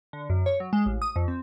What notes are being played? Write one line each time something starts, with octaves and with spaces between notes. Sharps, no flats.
D3
F#2
C#5
F#3
G#3
A1
D#6
F2
C4